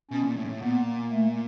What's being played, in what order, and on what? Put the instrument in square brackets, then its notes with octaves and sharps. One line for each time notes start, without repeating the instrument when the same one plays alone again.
[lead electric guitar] B2 [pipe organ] C#4
[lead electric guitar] A#2
A2
G#2
A2
[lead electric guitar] A#2 [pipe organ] B3
[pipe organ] A3